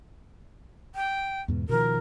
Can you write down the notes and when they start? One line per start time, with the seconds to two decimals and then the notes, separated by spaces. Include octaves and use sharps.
0.95 G5
1.48 E2 G#2 B2
1.69 B2 D#3 F3 A#4